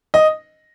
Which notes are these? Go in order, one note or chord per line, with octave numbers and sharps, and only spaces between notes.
D#5